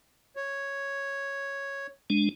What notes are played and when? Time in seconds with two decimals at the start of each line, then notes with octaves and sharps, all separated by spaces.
0.36 C#5
2.10 G#3 D4